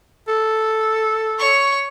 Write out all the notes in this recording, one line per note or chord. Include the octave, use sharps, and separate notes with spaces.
A4
C#5 C#6